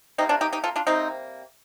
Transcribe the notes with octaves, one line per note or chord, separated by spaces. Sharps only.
C3 G3 A#3 C4 D#4
D4 F4
D#4 G4
D#4 G4
F4 A4
D4 F4
C3 G3 A#3 C4 D#4